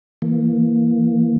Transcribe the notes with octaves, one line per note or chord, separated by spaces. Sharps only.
E3 A#3